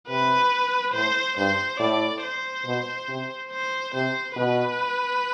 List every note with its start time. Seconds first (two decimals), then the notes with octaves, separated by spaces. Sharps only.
0.09 C3 B4
0.94 A2 C5
1.37 G2 C5
1.79 A2 D5
2.23 C5
2.65 B2
3.08 C3
3.51 C5
3.94 C3 C5
4.36 B2 B4